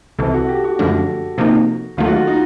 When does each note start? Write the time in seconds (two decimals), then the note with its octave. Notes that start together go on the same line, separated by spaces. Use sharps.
0.19 C2 C3 E3 A4
0.34 F#4
0.49 G4
0.64 F#4
0.79 F#2 D3 F3 A3 D4
1.38 C3 F3 A#3 D#4
1.97 D#2 D#3 F#3 A3 F4
2.07 F#4
2.12 F4
2.27 D#4